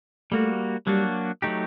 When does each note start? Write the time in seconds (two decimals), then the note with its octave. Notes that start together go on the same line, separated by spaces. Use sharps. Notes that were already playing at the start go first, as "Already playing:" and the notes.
0.32 G3 A3 A#3 F#4
0.87 F#3 G3 A#3 D4 F#4
1.42 F#3 A3 D#4 G4